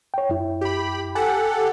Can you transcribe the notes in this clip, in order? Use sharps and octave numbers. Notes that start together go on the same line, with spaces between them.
C#5 G5
F#2 E4
G4 B5
G4 A4 F#5 G#5